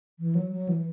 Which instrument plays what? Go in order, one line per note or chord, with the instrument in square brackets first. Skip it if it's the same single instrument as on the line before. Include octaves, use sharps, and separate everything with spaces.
[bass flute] E3
F#3
F#3
E3